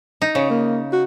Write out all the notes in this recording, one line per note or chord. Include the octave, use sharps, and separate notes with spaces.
D#4
C#3 C#5
A#3
F#4